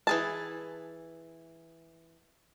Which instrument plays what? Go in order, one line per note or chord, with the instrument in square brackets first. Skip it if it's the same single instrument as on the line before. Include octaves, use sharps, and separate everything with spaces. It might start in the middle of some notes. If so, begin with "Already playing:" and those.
[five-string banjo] E3 G#4 A5